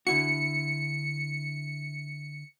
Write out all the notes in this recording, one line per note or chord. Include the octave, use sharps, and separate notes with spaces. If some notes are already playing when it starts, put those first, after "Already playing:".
D3 E4 F#4 C#7